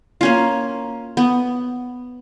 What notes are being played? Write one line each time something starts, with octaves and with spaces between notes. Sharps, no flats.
A#3 C#4 F4
B3